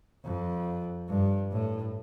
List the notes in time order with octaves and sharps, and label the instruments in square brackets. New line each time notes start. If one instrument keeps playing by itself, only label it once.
[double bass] F2
G2
A2